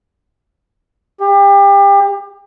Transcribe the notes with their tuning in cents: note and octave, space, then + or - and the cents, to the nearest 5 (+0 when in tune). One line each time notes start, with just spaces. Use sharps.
G4 +30